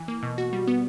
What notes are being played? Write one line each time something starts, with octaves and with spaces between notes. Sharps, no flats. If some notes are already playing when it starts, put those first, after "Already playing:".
Already playing: E3
A#3
B2
F#4
G3
B3